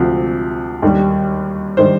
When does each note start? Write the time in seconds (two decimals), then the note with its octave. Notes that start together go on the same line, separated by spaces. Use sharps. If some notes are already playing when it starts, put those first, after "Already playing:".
Already playing: D2 C3 F3
0.82 D#2 D#3 G3
1.77 D#3 G3 C5